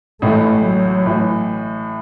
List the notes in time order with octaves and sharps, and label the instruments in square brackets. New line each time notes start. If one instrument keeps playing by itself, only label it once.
[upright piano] A1 A2 E3 [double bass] A3
[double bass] F#3
[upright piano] A2 E3